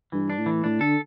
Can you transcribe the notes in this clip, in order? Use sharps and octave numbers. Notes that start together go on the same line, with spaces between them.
G2 E3
D4
A2
E3
A2 D4
D3 A4